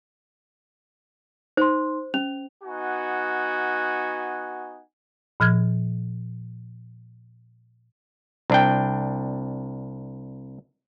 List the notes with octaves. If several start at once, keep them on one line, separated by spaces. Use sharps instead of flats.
D#4 C5 C6
C#4 F7
B3 D#4 F#4 F#5 G#5
A#2 F3 F6 G#6
C2 D4 G5